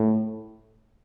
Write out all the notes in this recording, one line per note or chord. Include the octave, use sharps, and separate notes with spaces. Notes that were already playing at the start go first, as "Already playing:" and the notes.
Already playing: A2